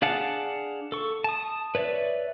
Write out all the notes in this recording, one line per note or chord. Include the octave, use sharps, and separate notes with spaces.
D4 G#4 F5 F#5 A5
A4 C#6
A5 D#6
B4 C#5 D5 E5